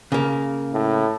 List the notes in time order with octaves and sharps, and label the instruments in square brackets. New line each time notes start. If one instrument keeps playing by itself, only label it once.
[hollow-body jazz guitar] C#3 A#3
[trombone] A2